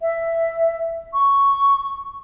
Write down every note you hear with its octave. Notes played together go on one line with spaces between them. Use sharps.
E5
C#6